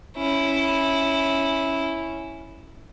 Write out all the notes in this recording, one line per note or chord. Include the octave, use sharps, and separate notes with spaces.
C#4 E4